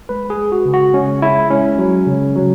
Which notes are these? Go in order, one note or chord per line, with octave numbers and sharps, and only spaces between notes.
G#3 B4
G#4
G#3
F#4
C#3
F#4
G#3 C#4
G#3 E4
G#3 C#4
F#3
C#3
F#3